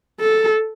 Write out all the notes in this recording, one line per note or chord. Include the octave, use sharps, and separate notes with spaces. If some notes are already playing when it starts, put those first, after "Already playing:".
A4